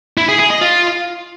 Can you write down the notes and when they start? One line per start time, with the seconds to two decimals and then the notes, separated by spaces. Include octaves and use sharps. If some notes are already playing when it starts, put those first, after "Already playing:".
0.18 E4
0.28 G#4
0.39 G#4
0.50 D#5
0.61 F4